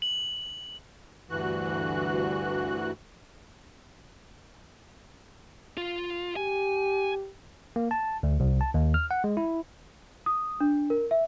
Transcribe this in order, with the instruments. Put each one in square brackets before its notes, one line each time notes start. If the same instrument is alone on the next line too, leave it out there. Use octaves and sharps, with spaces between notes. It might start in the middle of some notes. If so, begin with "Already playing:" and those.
[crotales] F#7
[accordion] D2 G2 E3 F#4 F#6
[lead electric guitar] F4
[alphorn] G4 [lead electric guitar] G#5
[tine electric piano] A#3
A5
D2
C2
A5
D#2
F6
F#5
G#3
E4
[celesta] D#6
D4
A#4
E5